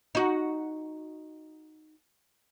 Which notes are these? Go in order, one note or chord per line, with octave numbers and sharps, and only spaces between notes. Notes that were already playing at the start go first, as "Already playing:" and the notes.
D#4 F#4